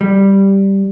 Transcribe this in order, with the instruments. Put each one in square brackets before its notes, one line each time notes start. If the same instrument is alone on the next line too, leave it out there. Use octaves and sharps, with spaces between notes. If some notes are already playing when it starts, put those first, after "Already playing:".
[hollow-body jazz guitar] G3